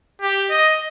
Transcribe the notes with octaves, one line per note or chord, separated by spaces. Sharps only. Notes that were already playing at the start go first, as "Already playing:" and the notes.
G4
D#5